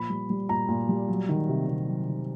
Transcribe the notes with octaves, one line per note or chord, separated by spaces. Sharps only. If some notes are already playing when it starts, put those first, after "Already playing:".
Already playing: A#2 F3 B5
G3
G3
A#2 A#5
A#2
G3
F#3
D#3
C3
C3
F#3
D#3